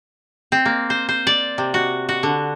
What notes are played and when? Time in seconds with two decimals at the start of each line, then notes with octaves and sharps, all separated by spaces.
0.52 C4
0.65 A#3
0.90 C5
1.09 C5
1.27 D5
1.58 C3
1.74 F#4
2.09 F#4
2.23 D3